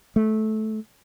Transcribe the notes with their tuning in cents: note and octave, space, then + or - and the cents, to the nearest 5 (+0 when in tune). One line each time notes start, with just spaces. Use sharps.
A3 -15